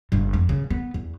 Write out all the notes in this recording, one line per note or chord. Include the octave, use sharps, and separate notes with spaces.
G1 C#3
F2
C#3
B3
E2